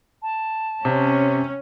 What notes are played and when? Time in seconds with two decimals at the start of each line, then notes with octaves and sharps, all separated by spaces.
0.22 A5
0.85 C3 C#4